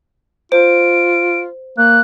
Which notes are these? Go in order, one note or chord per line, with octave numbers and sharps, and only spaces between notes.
F4 C5 D7
A#3 F#6